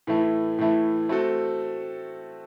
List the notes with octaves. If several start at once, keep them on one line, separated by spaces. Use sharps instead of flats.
A2 E3 A3 E4
A2 E3 A3 E4
A3 C4 F#4 A4